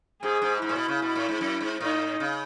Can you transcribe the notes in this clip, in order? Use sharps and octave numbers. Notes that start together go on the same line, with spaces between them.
G#2 G#4
G#2
G#2 E4
A2
B2
C#3
B2
A2
G#2
F#2
G#2
A2 D#4
C#3